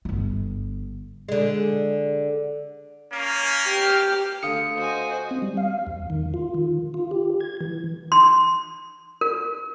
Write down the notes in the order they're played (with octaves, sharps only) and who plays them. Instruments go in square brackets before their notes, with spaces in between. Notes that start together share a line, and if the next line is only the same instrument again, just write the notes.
[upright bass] G1 B3
[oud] D3 G#3
[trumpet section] A#3 C#4
[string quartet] G4 F6
[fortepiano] D3 A3 [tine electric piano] F5 D#6 C#7
[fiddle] F#4 G#5 [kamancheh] C5 D#5
[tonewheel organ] C4
G3
F5
E2
D#3
F4
D#3
F4
G4
G#6
E3
[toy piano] C6
A#4